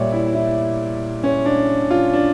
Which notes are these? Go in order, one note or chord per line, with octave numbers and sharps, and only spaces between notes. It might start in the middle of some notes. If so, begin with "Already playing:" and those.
Already playing: A#2 G3 C#5 D5 E5
E4
E4
C#4
D4
F4
D4